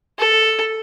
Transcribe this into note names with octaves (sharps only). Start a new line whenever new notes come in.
A4